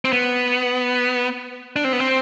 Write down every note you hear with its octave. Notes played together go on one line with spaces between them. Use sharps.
C4
B3
D4
C4
B3
C4